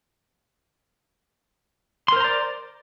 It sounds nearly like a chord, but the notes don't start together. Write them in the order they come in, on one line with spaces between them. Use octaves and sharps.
C6 A#4 C5 A#5 D5